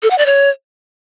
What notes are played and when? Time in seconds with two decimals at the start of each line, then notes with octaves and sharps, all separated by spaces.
0.03 A4
0.11 F#5
0.18 D5
0.26 C#5